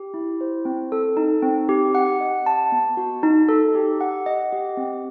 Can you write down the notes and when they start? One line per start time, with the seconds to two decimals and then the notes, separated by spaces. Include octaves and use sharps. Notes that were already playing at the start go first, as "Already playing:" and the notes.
Already playing: G4
0.14 E4
0.41 C5
0.65 C4
0.92 A4
1.17 D#4
1.42 C4
1.69 G4
1.95 F#5
2.21 D#5
2.46 A5
2.72 B3
2.97 F#4
3.23 D#4
3.48 A4
3.75 G4
4.01 F#5
4.26 D#5
4.53 G4
4.77 C4